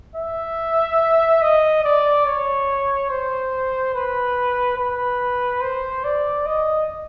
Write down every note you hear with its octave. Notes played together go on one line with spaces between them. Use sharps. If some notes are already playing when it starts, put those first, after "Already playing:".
E5
D#5
D5
C#5
C5
B4
B4
C5
D5
D#5